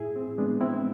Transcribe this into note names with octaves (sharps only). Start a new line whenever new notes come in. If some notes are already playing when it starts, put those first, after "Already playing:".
Already playing: A2 E4 G#4
C4
G#3 B3 D4
C4 E4